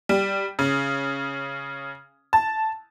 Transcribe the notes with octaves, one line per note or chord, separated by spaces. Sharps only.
G3
C#3
A5